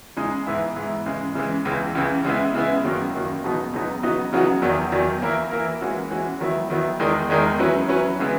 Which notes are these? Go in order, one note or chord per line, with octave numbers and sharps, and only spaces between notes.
C#3 G#3 D#4 G#4
G#2 E3 B3 E4
G#2 E3 B3 E4
C#3 E3 G#3
C#3 E3 G#3
C#2 C#3 E3
C#2 C#3 E3
C#3 G#3 B3 E4
C#3 G#3 B3 E4
F#2 D#3 F#3 A#3
F#2 D#3 F#3 A#3
C#2 B2 F#3 B3 D#4
C#2 B2 F#3 B3 D#4
C#3 F#3 B3 D#4 F#4
C#3 F#3 B3 D#4 F#4
E2 D#3 F#3
E2 D#3 F#3
E3 A#3 E4 A#4
E3 A#3 E4 A#4
E3 G#3 C#4 F#4
E3 G#3 C#4 F#4
D#3 F#3 B3 E4
D#3 F#3 B3 E4
E2 D#3 G#3 D#4 A#4
E2 D#3 G#3 D#4 A#4
F#3 C#4 E4 B4
F#3 C#4 E4 B4
C#3 E3 G#3 B3